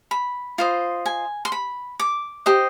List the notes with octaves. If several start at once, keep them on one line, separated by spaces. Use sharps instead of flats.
B5
F4 C5 D#5
G#5
C6
B5
D6
G4 C5 D#5